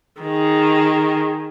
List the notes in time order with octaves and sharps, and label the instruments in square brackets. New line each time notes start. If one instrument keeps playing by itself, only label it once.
[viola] D#3 G#4